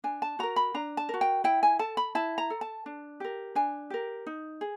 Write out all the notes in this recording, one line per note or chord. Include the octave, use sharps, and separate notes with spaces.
D4 G#5
A5
F#4 A#4 A#5
B5
D4 A#5
A5
F#4 A#4
G5
E4 G5
G#5
A4 A5
B5
E4 A5
A#5
A4
A5
D4
G4 A#4
D4 G#5
G4 A#4
D#4
G#4